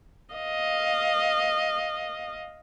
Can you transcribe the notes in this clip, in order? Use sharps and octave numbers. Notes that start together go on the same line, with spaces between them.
D#5 F5